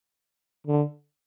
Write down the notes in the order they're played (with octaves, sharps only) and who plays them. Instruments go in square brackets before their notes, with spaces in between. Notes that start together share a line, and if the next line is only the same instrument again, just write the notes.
[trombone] D3